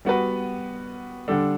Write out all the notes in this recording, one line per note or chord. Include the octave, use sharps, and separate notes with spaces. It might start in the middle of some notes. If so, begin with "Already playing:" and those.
G3 B3 F#4 B4
D3 G3 D4 A4